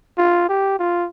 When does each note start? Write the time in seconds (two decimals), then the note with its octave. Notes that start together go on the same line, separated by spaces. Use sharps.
0.18 F4
0.49 G4
0.79 F4